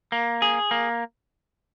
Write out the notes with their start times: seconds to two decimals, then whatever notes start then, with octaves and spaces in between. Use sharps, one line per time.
0.12 A#3
0.42 G#4
0.71 A#3